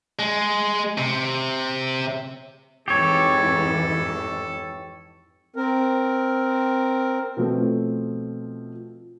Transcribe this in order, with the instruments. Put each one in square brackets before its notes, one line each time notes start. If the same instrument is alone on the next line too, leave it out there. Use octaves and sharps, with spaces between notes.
[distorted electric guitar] G#3
C3
[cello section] F2 G#2 E3 [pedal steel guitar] G4 C#5 [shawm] A4
[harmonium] C4 A#4
[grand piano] B2 F3 A3 C4